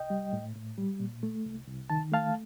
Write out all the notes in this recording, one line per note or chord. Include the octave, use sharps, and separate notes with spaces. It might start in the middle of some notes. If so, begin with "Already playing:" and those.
Already playing: C2 D#5 G5
G3
A2
A2
G3
A#2
A3
C2
C2
D#3 A5
A3 F5 A5